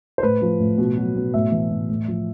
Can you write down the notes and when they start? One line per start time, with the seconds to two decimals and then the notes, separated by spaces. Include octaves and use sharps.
0.18 C5
0.23 A2 B4
0.42 F3
0.60 A2
0.78 B2
0.97 F#3
1.16 B2
1.34 A2 E5
1.52 E3
1.70 A2
1.90 A2
2.08 F3